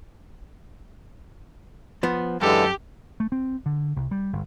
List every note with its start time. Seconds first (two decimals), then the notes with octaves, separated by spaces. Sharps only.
2.03 F3 B3
2.41 F#2 D3 E3 G#3 G4 A4
3.20 A3
3.32 C4
3.66 D3
3.96 C2
4.11 G3
4.33 G1